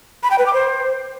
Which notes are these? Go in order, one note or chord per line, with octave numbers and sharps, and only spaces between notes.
B5
G5
B4
D6
C5